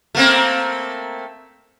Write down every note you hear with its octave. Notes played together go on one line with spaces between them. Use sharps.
A3 A#3 C4